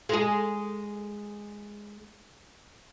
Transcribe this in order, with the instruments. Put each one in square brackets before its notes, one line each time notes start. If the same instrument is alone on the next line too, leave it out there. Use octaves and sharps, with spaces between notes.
[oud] G#3 G#4